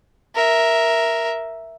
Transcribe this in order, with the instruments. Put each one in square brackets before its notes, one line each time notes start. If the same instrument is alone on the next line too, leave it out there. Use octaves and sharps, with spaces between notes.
[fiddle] A#4 E5